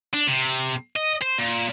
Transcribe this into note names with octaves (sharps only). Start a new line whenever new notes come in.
D4
C3
D#5
C5
A#2